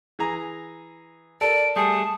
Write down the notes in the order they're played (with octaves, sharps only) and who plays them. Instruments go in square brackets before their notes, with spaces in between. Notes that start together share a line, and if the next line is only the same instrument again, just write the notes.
[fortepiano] E3 G#4 A#5
[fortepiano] A4 A#4 [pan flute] D5 [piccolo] D7
[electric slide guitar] G3 A3 G#4 [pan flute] A5 [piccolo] D#6